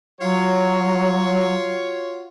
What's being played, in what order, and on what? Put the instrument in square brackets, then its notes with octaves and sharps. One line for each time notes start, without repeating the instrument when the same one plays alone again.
[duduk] F#3 [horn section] F4 F#4 C#5